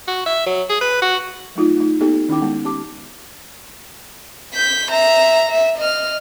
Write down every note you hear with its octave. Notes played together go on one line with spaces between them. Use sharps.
F#4
E5
F#3
G#4
B4
F#4
F#3 A3 D#4 F4
A3 D#4
A#3 B3 D#4 G4 A4
D#3 C#4 D#4 E4 G5 D6
G#3 B3 G5
C#4 G4 A5 D6
G6 B6
E5 A#5
E5
D#5 F6